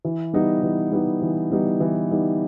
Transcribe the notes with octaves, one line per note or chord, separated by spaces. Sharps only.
E3
G3 B3 D#4
E3
G3 B3 D#4
E3
G3 B3 D#4
E3
G3 B3 D#4